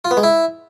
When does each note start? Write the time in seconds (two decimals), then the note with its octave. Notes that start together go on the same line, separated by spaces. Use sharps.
0.05 F4
0.11 B3
0.17 G#3
0.23 E4